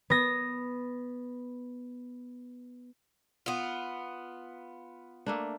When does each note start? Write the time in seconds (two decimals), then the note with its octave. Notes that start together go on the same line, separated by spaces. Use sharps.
0.10 B3 A#6
3.46 B3 F4
5.26 A3 A#3 D4